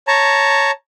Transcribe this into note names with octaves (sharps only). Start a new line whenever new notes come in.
C#5 A5 A#5